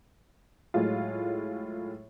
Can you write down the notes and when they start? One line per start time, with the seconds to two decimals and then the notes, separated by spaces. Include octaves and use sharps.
0.74 A2 F#3 G#3 F4